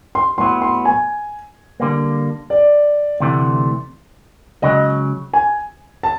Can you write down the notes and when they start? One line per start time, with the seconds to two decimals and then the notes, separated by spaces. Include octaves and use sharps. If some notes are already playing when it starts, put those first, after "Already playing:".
0.15 C6
0.38 A2 F#3 B3 E4 C6
0.62 C6
0.85 G#5
1.80 D3 G3 A#3
2.50 D5
3.20 D2 C3 E3 A3
4.62 C#2 C#3 F#3 D#5
5.34 G#5
6.03 A5